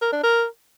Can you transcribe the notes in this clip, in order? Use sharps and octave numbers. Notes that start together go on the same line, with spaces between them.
A#4
D4
A#4